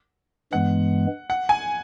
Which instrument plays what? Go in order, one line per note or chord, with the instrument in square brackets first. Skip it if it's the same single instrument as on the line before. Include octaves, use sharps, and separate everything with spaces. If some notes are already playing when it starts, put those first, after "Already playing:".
[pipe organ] G2 E3 G#3 B3 [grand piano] F#5
[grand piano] F#5
G#5